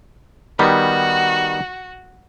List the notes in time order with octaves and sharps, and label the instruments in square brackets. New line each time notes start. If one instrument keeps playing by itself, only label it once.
[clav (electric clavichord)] D#3 G3 B3 [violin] F#4